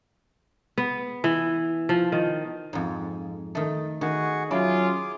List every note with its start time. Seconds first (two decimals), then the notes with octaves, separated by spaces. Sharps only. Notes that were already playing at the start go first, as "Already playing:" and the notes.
0.78 B3
1.24 E3
1.89 F3
2.12 D#3
2.73 F2 G#2
3.55 D#3 A3
4.01 D#3 F#4 G#4 C#6
4.51 F#3 C#4 E4 F4 G#4 D6